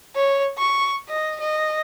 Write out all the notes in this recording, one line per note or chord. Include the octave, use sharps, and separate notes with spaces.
C#5
C#6
D#5
D#5